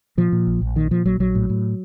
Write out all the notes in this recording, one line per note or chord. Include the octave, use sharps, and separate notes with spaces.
A#2 F3
A#2
A#1
A#1
A#2 D#3
A#2 F3
A#1 F#3
A#1 F#3
A2
A2